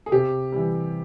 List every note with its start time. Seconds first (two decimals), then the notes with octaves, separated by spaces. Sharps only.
0.06 G#4
0.12 C3 G4
0.52 E3 G3